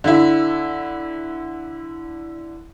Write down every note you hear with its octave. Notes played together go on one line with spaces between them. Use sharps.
D3 E4